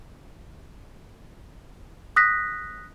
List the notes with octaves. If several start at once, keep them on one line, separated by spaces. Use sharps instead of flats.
D#6 F#6 A#6 B6